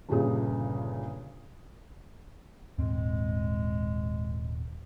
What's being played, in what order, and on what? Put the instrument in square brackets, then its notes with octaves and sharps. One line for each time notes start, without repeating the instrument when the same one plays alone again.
[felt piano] G1 G2 A#2 C#3 D#6
[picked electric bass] D#1 G#2 C4 [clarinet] G#3